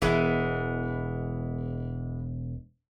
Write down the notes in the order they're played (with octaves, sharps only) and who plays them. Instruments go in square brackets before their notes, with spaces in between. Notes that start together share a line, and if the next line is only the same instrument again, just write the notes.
[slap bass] E1 [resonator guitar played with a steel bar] E3 G#3 B3